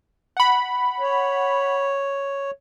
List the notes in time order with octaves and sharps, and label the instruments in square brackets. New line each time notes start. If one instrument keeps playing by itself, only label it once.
[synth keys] F#5 B5
[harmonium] C#5